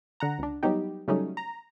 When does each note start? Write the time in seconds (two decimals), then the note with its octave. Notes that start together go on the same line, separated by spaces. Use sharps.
0.20 D3 F#5 A#5
0.39 C#2 D4
0.63 F#3 G3 B3 D#4 G4
1.08 C#3 F#3 G3 A3 C#4 D#4
1.37 A#5